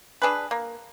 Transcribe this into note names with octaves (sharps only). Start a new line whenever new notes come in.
D4 G#4 B4
A#3